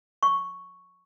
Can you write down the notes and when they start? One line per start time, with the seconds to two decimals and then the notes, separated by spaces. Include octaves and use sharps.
0.23 C#6